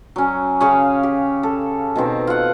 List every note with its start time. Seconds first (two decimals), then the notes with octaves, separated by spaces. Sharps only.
0.16 F#3 C#4
0.60 C#3 G#4 C#5 F5
1.03 G4
1.43 A4
1.96 B2 D#3 C4
2.27 F4 F#5